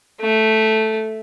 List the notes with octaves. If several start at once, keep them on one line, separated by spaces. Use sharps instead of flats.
A3